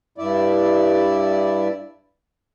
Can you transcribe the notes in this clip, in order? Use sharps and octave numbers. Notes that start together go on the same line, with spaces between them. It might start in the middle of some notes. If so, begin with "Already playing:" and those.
G2 E4 D5